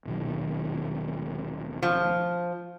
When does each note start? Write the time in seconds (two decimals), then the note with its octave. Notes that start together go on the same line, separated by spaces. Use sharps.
0.06 D#1 B1 D#3
1.83 F3